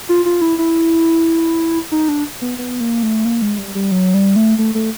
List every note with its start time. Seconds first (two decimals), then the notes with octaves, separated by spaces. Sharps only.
0.09 F4
0.25 F4
0.41 E4
0.59 E4
1.92 D#4
2.09 D4
2.42 B3
2.58 B3
2.80 A#3
3.03 A3
3.25 A#3
3.42 G#3
3.58 G3
3.75 G3
3.92 F#3
4.14 G3
4.36 A3
4.58 A3
4.75 A3